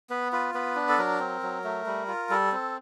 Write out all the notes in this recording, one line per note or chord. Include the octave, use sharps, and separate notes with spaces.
B3 B4
F4 B4
B3 B4
D4
A4
F#3 A#4
C4
F#3
A3
G3
F4
G3 A4
C4